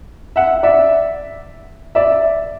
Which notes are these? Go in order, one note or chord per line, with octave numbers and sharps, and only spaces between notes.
E5 F#5
D5 E5
D5 E5